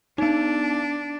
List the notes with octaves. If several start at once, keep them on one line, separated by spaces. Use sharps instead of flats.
B3 D4 D#4